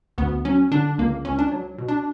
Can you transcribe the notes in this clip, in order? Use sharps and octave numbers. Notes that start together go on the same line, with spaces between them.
D2 B3
F#3 C#4
D3 D4
C#2 A#3
C#2 C#4
D4
F#3
B2
D4